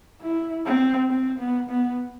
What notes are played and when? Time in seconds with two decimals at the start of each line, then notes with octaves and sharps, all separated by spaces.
0.22 E4
0.66 C4
1.10 C4
1.39 B3
1.70 B3